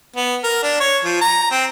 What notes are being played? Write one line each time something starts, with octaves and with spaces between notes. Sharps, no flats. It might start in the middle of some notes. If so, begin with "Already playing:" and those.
B3
A#4
D4
C#5
F3
A#5
C4